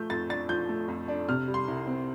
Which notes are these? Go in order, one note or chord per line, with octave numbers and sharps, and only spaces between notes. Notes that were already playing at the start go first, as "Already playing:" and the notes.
Already playing: F3 A3 G6
F2 A6
D4 A6
F3 G6
A3
F2
D4
C3 F6
G3
C6
C2
C4